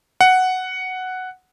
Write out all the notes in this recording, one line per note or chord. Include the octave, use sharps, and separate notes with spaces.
F#5